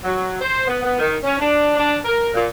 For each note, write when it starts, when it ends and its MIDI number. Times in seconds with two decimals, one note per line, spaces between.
0.04 0.39 54
0.41 0.65 72
0.67 0.82 59
0.82 0.95 59
0.99 1.16 51
1.23 1.36 61
1.39 1.75 62
1.76 1.97 62
2.05 2.29 70
2.34 2.44 46